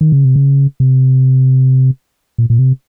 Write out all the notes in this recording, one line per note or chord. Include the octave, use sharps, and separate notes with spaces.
D#3
C#3
C3
C#3
C3
A#2
A#2
C3